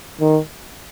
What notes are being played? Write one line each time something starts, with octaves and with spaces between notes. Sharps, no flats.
D#3